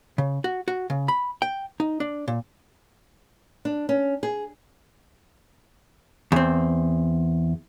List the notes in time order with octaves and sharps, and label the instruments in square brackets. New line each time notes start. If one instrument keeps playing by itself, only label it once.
[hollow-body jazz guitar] C#3
F#4
F#4
C#3
B5
G5
D#4
D4
A#2
[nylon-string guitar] D4
C#4
G#4
[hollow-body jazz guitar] E2 C4